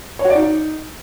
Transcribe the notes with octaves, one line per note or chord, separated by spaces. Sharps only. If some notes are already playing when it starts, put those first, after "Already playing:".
C#5
F#4
D5
D#4